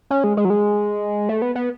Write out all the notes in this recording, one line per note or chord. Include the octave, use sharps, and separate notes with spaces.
C#4
G#3
G#3
F#3
G#3
A3
B3
B3